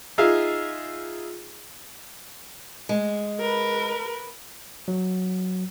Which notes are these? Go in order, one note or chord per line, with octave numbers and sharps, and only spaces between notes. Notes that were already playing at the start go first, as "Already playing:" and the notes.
D#4 F4 G#4 E5 F5
G#3
A#4 B4
F#3